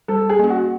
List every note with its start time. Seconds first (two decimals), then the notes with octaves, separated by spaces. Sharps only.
0.08 G3 A4
0.29 G#4
0.39 A#3 C#4
0.50 F#4